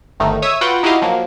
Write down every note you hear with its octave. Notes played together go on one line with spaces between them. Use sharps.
G1 D#3 A3 D#4
C#5 E5 D#6 E6
F4 F#4 B4 F#5 G5
D#4 E4 F#4 G4 D#5 F5
F3 F#3 A#3